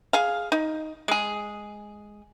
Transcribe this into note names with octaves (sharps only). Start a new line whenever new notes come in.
G#4 F5
D#4
G#3 G#4